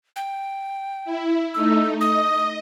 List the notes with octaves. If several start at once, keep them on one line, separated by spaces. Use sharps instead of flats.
G5
E4
A3 D#4 E6
D#5 D#6